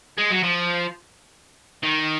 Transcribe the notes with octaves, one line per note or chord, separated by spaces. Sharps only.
G#3
F#3
F3
D#3